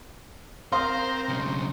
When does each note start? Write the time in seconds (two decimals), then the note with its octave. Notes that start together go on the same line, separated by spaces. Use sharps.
0.72 C4 A#4 C5 F5 C6 D#6
1.29 B1 C#3